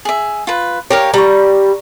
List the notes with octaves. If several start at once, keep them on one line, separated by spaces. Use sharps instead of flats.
G#4 E5
F4 B4
G4 A#4 C#5 F5
G3 A#5 C#6